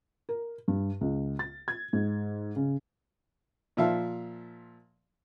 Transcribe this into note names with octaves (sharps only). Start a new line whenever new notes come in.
A#4
G2
C#2
A6
G#6
G#2
C#3
A#2 F3 E5 F5